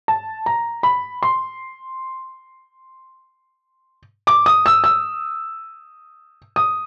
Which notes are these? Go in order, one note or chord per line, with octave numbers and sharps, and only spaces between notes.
A5
A#5
B5
C6
D6
D#6
E6
E6
D#6